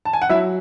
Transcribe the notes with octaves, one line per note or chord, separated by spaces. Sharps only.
A5
G#5
F#5
F#3 E4 E5